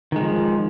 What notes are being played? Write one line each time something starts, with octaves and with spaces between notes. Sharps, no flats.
D#3 F3 G#3